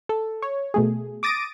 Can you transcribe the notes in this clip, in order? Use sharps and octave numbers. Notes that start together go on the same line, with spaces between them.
A4
C#5
B2 A3 G#4
D6 D#6 A6 A#6 D7 D#7